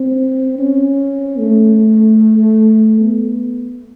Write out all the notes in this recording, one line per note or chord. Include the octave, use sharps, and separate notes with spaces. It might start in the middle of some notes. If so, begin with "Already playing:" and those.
Already playing: C4
C#4
A3
B3